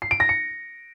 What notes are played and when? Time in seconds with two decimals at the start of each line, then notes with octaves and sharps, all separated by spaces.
0.02 C7
0.11 D7
0.20 A#6
0.29 C#7